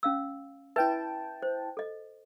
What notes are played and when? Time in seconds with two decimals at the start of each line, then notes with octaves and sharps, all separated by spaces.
0.03 C#4 F5 E6
0.76 E4 B4 E5 G5 A5
1.42 C5
1.77 A4 D#5